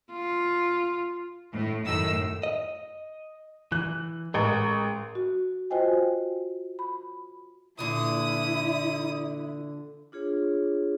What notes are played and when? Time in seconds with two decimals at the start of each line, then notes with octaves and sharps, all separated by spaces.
0.13 F4
1.52 A2
1.84 F#2 A2 D#3 E6
2.43 D#5
3.72 E3 F#6
4.34 A1 G#3 A#4
5.15 F#4
5.70 F4 F#4 C5 D#5 G5 G#5
6.79 B5
7.79 A#2 D3 E3 E4 D#6
10.12 D4 F4 G#4 C#5